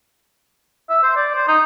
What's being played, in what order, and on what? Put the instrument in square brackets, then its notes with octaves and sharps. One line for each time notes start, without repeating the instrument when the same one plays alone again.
[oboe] E5
C5
D5
C5
D#4